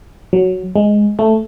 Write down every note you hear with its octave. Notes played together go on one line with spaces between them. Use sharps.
F#3
G#3
A3